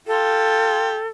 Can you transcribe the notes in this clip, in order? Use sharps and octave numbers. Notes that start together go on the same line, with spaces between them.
F4 G4 A4